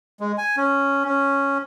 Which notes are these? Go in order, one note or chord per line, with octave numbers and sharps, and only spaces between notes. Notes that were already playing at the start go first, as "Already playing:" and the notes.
G#3
G#5
C#4
C#4